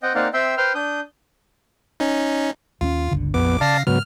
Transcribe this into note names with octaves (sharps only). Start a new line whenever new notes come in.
C4 D#5 F#5 G5
A#3 C4 D#4 D5 F5 F#5
C4 E5 G5 C6 E6
B4 C5 G5 C6 F6
D4 D#6 G6
C#4 D#4
D#2 A3 C#4 F4
G1 C#2 D3
A#1 F2 B3 D6
C#3 D5 F5 A5 A#6 C7
G#2 C#3 F#3 G#3 B3 F6